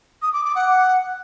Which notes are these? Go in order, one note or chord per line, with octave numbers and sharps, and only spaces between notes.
D#6
D6
D6
F#5